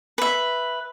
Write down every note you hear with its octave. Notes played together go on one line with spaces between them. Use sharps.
B4 E5